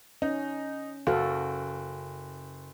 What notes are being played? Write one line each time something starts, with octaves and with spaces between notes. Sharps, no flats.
C#4 D#4
F#1 F#4 A4 F5